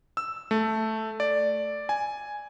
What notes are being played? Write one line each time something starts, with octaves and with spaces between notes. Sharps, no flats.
E6
A3
D5
G#5